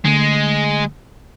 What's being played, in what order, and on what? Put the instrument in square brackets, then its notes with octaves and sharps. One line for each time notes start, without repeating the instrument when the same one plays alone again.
[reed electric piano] D3 A3 [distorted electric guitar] G#3